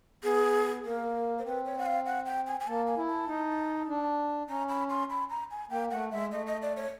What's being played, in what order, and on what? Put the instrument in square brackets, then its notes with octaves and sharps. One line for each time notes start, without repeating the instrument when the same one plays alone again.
[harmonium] B3 [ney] G#4
[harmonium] A#3 [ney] A#4
[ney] C5
[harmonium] C4 [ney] B4
[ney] C#5
F#5
F5
F#5
G5
G#5
G#5
[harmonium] A#3 [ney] A5
[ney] G#5
[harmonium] E4
[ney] A5
[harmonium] D#4
D4
[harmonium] C#4 [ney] A#5
[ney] B5
C6
B5
A#5
G#5
[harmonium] A#3 [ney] G5
[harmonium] A3 [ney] F#5
[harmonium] G#3 [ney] E5
[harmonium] A3 [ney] D#5
[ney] D#5
D5
C#5